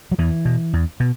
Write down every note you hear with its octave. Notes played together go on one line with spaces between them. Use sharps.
F#3
E2 E3
B2
E2
B2